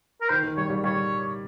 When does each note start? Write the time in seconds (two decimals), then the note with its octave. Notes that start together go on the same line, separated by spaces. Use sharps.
0.21 A#4
0.29 D#3 C5
0.43 D#3
0.57 G3 C#5
0.70 G3
0.84 G3 C#5